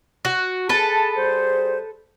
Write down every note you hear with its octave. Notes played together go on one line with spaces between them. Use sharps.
F#4
G#4 A4 B4 A5
G3 G#4 C5